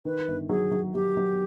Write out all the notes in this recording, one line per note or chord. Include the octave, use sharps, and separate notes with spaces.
D#3 B4
G1
F#3 G#4
F#3
F#3 G4
F#3